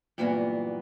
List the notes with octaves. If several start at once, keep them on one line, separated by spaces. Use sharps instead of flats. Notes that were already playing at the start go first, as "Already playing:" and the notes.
G2 A#2 E3 F#3 A#3 B3